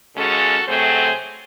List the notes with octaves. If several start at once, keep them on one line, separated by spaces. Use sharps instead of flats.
D#2 C#3 G#3 C#4 F#4 A4
C3 F#3 A3 C4 G#4 C5